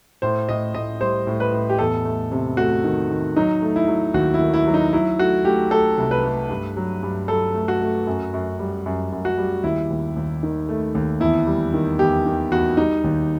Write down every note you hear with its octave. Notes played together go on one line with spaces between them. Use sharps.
A2 C5
A2 D#5
A2 D#5
G3 C5
A2
B4
A2
G4
E2 A4
A3
C3
A3 F#4
D#3
D#3
F#3 D#4
A3
E4
F#3
D#2 F#4
E4
D#3
E4
F#3
D#4
F#3 E4
A3 F#4
A3 G4
A3 A4
C2
B4
A3
G2
F#3
G2
F#3 A4
A3
F#4
A3
F#2
F#2
G3
F#2
F#2
F#4
G3
D#2 E4
D#2
D#2
D#3
A3
D#2
E2 E4
G3
D#3
E2 G4
D#3
E2 F#4
G3 D#4
D#2